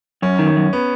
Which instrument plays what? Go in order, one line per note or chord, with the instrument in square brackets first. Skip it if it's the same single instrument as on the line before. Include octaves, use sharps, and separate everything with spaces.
[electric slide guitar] F#2 [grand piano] C#4
[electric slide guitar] D#3
[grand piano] C#4
[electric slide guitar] F#2
[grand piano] B3